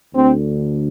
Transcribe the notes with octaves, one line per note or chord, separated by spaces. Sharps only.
D2 D3 C4